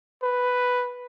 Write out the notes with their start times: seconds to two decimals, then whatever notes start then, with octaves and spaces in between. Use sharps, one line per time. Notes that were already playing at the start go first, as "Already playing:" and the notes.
0.23 B4